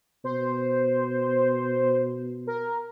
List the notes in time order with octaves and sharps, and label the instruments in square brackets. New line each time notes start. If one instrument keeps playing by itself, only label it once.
[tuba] B2 [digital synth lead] C5
[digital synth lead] A#4